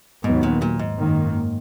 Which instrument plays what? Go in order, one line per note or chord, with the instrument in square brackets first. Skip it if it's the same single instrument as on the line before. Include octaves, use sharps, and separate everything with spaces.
[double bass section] D#2 D#3 F#3 B3 [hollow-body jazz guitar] G#2
[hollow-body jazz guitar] A#2
A#2
G#2
[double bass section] F#2 D#3 A#3